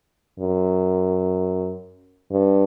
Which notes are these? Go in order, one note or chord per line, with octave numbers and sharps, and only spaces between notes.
F#2
G2